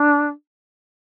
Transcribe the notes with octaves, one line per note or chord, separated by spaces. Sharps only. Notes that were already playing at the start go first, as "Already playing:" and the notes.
Already playing: D4